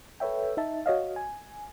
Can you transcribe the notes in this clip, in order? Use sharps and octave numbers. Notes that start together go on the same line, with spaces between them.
A4 B4 C#5 E5 G5
D#4 E5 A5
F#4 C#5 D#5 F5
G#5